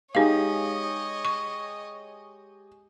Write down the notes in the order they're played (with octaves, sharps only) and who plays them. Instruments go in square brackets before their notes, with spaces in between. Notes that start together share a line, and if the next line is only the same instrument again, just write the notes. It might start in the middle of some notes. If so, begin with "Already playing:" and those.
[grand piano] G#3 G4 G#4 [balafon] D#4 F5 [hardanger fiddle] C#5 D#5
[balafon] C#6